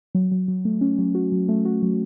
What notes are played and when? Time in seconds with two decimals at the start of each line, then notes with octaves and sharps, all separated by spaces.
0.15 F#3
0.32 F#3
0.48 F#3
0.65 A3
0.81 C#4
0.98 F#3
1.15 F#4
1.32 F#3
1.49 A3
1.65 F#4
1.82 F#3